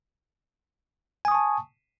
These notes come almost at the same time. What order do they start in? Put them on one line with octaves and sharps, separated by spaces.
G#5 D#6 C#6 A5